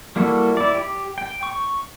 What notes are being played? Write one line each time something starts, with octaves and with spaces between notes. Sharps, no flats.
G3 A#3 E4 F#4 A4
E4 D5
G4
G5
C#6